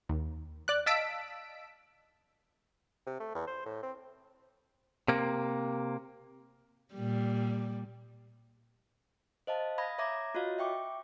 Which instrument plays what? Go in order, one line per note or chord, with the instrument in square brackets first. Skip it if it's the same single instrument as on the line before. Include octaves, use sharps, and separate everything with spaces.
[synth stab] D#2
D5 F#6
D#5 F5 A5 E6 B6 D7
[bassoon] C3
A3
E2
C5
A2
C4
[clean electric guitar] C3 A#3
[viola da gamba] A#2 G3
[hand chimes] C5 D#5 F5 A5
F5 B5 D#6 G#6 A#6
C#5 E5 A#5 D6 G#6 A#6
F4 F#4 C#5 D#5 F5
E5 G5 C#6 D6